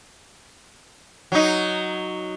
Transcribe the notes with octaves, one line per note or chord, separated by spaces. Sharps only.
F#3 D#4